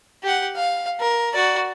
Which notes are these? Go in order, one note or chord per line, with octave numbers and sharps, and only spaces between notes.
G4 F#5
F5
A#4
F#4 D5